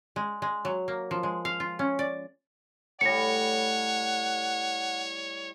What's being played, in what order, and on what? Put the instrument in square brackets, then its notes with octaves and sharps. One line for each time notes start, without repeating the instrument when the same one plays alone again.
[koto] G#3
G#3
F#3
A#3
F3
G#3
F5
F4
C#4
D5
[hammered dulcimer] A2 G3 [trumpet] C#5 [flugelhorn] F#5 [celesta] A#6 C#7